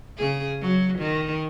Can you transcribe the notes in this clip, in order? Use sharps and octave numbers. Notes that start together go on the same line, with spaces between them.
C#3 G#4
F#3
D#3